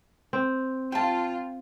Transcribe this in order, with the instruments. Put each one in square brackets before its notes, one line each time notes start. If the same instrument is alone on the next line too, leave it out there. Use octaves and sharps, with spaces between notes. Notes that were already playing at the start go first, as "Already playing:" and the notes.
[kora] C4
[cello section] F4 [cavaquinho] G5 A5